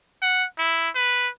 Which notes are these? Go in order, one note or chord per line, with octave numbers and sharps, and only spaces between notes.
F#5
E4
B4